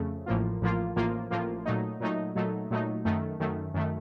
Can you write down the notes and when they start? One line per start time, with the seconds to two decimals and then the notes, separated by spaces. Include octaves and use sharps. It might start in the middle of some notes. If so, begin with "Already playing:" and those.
Already playing: F2 C#3 A3
0.26 A1 A2 F3 A#3 F4
0.61 A1 A2 F3 A#3 F4
0.96 A1 A2 F3 A#3 F4
1.31 A1 A2 F3 A#3 F4
1.66 A#2 F#3 A3 D#4
2.00 A#2 F#3 A3 D#4
2.35 A#2 F#3 A3 D#4
2.71 A#2 F#3 A3 D#4
3.05 F#2 D#3 A3
3.40 F#2 D#3 A3
3.74 F#2 D#3 A3